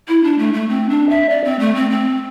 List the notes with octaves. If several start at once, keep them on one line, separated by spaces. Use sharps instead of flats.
E4
D4
A3
A3
C4
D4
E5
D5
C4
A3
C4
C4